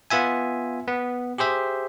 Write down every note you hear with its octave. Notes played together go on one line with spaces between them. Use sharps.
B3 F4 E5 G#5
B3
G4 G#4 C5 E5